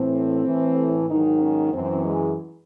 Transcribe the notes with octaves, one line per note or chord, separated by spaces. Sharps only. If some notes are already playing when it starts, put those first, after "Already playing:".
Already playing: A2 E3 C4
A2 E3
G#2 D#3 F#3 D#4
C#4
F#2 E3 C4
G#3